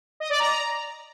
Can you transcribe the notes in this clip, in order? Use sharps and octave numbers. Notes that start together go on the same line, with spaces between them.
D#5
D5
A#5